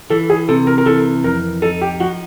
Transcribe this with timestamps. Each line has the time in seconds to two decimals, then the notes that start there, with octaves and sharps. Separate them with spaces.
0.10 E3 A4
0.30 G#4
0.49 C3 A4
0.67 A#4
0.78 A#4
0.86 E3 A4
1.24 F2 A#4
1.62 D#4 A4
1.81 G4
2.00 F3 F#4